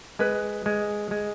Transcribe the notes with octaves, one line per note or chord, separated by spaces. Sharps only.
G#3 B4
G#3
G#3